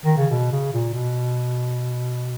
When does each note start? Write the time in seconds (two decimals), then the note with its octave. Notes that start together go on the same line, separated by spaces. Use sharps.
0.05 D#3
0.17 C#3
0.31 B2
0.52 C#3
0.73 A#2
0.93 B2